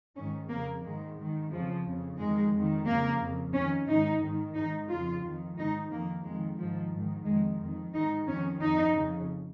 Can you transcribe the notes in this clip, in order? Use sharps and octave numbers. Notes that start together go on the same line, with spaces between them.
G#2 D#3 C#4
F2 C#3 A#3
G#2 D#3 G#3
G#2 D#3
F2 C#3 F3
F2 C#3
F2 D#3 G#3
F2 D#3
F2 C#3 A#3
F2 C#3
F2 D#3 C#4
G#2 D#3 D#4
G#2 D#3
G#2 D#3 D#4
F2 C#3 F4
F2 D#3
G#2 D#3 D#4
F2 D#3 A#3
F2 D#3 G#3
G#2 D#3 F3
G#2 D#3
F2 D#3 G#3
F2 D#3
G#2 D#3 D#4
F2 D#3 C#4
F2 D#3 D#4
F2 C#3